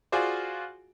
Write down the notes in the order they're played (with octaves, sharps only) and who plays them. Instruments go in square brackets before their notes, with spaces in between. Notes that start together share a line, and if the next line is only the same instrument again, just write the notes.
[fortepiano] F4 F#4 G#4 C5 D5